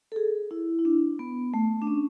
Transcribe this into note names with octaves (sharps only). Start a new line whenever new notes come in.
A4
G#4
E4
E4
D4
B3
A3
D4
C#4